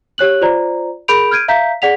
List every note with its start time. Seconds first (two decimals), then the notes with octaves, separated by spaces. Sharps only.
0.18 G4 C#5 F#6 F#7
0.41 F4 C5 D5 A#5
1.08 G#4 A#4 B5 G6 D7 F7
1.31 F6 G6 G#6 D7 D#7
1.48 E5 F5 A#5 G6 B6
1.82 G#4 D5 F#5 B6 F7